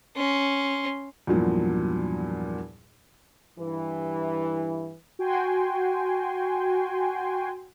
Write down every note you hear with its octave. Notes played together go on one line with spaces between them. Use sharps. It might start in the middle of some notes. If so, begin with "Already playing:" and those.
C#4 C6
E2 G2 A#2 F3 F#3
G2 E3
F#4 G5 G#5 C6